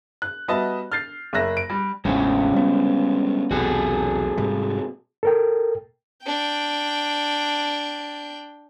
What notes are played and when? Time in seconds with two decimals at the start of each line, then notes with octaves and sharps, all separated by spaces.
0.22 F#6
0.48 G3 B3 F#4 D#5 E5 A5
0.92 F6 G6 A6 C7
1.33 F#1 A#3 A#4 E5 F#6 A#6
1.57 D7
1.70 G3
2.05 A1 E2 G#3 C4 C#4
2.53 G3 B3
3.51 B1 E2 C3 F#4 G#4 A4
4.38 G#2 C3 G3
5.23 A4 A#4 G5
6.24 D4 G5